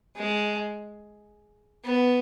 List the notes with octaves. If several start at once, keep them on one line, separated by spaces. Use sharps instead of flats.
G#3
B3